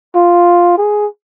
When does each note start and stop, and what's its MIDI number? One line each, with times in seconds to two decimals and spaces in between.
0.15 0.76 65
0.78 1.06 68